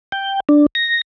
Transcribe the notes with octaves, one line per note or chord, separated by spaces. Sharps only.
G5
D4
A#6